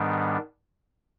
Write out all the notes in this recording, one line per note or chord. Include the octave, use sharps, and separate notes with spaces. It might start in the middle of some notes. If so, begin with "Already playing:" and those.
Already playing: G#2 D#3 G3 B3 D4